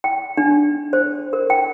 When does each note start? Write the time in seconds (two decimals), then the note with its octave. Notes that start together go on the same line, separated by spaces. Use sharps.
0.04 G5
0.37 D4
0.93 C5
1.33 A#4
1.50 G5